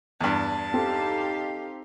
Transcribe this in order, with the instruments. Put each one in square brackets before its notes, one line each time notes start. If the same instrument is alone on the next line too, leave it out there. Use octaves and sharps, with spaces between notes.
[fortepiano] E2 G2 [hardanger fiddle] A5
[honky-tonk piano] C4 A4 [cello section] D#4 G4 F5